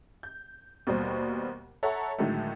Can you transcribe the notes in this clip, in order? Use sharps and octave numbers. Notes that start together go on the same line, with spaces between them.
G6
D#2 B2 G3 C5
A4 C#5 E5 F#5 A#5
A2 D3 D#3 F#3 G#3 A3